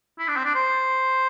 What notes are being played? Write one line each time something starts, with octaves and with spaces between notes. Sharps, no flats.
E4
D4
C4
D4
C5